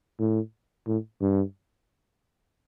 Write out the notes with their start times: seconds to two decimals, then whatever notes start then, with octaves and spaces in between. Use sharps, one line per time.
0.19 A2
0.87 A2
1.21 G2